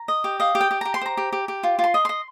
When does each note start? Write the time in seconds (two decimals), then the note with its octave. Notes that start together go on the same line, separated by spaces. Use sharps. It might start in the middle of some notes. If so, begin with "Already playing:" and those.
Already playing: A#5
0.08 D#5
0.24 G4
0.40 D#5 F5
0.55 G4
0.61 G5
0.71 G4
0.81 G4 A#5
0.94 C6
1.01 C5 A#5
1.17 G4
1.33 G4
1.48 G4
1.63 F4
1.79 F4
1.84 C6
1.94 D#5
2.05 D#5 C6